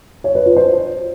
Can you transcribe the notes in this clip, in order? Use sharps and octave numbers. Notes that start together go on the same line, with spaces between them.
C#5
B4
F4
C5